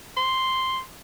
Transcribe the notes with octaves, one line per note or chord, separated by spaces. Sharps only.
C6